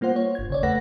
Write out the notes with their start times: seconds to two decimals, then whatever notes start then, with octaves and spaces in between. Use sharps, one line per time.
0.01 G3 A#3 F4 C5 F#5
0.16 C#5
0.35 G1 G#6
0.50 C#3 C#5 D5
0.63 E2 A3 A4 B4 F#5 A#6